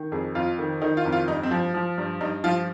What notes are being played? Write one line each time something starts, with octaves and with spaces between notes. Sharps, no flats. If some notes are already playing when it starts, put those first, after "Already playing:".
Already playing: D#3
F2 G#4
F2 F4
D#3
D#3 D#4
F4
F2
F4
G2 D#4
C4
F3
F3
G2
G2 D#4
F3 F4